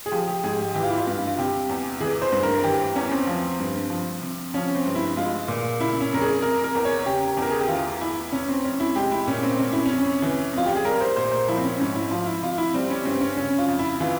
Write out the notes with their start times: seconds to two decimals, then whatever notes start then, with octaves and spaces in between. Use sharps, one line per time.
0.06 G#4
0.11 F3 G4
0.28 G4
0.44 G#2 G#4
0.58 G4
0.74 E3 G4
0.83 F4
0.90 E4
0.98 F4
1.07 G2
1.27 F4
1.37 C3 G4
1.69 E2
2.01 E3 G#4
2.22 C5
2.32 G2
2.43 A#4
2.64 E3 G4
2.96 E2 C#4
3.11 C4
3.27 F3
3.60 G2
3.90 F3
4.22 C3
4.54 F3 C#4
4.75 C4
4.86 G2
4.95 E4
5.17 G#3 F4
5.48 A#2
5.80 C#3 E4
6.01 C#4
6.12 F2 A#4
6.21 G#4
6.42 C3 A#4
6.64 A#4
6.75 E2
6.85 C#5
7.06 C#3 G4
7.37 E2
7.42 A#4
7.51 G#4
7.60 G4
7.69 E3 F4
8.01 E2 E4
8.32 C3 C#4
8.49 C4
8.64 F2 C#4
8.80 E4
8.95 G#3 G4
9.11 E4
9.27 A#2 C#4
9.43 C4
9.59 C3 C#4
9.73 E4
9.86 F2 C#4
10.22 E3
10.53 F2 F4
10.66 G4
10.76 G#4
10.84 G3 A#4
11.01 C5
11.16 A#2 C5
11.32 C5
11.48 F3 E4
11.57 C4
11.64 C#4
11.79 G#2 C#4
11.95 E4
12.11 F3 F4
12.26 E4
12.42 C3 F4
12.58 E4
12.74 G3 C4
12.90 C#4
13.05 G2 C4
13.21 C#4
13.37 C#3 C#4
13.58 F4
13.68 F2
13.79 E4
14.00 E3 F4